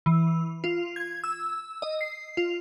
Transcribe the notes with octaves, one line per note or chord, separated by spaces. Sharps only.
E3
F4
G#6
E6
D#5
C7
F4